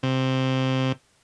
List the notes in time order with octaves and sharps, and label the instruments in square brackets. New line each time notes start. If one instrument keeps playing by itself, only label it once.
[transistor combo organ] C3